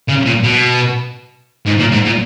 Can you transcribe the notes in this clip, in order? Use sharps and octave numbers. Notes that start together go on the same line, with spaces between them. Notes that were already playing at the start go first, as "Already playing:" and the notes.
C#3
A#2
B2
G#2
A#2
G#2
A#2